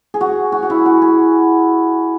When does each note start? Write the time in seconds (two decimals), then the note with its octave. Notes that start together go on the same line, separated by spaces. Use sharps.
0.14 G#4
0.21 F#4
0.52 F#4
0.63 F#4
0.70 E4
0.86 F#4
1.02 G#4